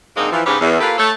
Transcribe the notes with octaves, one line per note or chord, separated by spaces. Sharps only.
G#2 D3 G#3 A#3 C4 D#4
E3 F3
G#2 C#3 C#4 G4 G#4 B4
E2
A#3 F4 G4 A4 B4
A3 A4 C#5